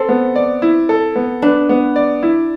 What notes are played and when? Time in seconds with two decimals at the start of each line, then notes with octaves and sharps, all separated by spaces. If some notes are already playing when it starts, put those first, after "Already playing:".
Already playing: C4 A4
0.09 B3
0.35 D5
0.62 E4
0.89 A4
1.16 B3
1.42 D4 B4
1.69 B3
1.96 D5
2.23 E4